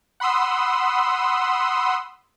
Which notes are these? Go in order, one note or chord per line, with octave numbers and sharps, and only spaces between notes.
F#5 B5 C6 D#6 E6